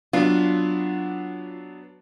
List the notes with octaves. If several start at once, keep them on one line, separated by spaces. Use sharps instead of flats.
F#3 B3 D4 F4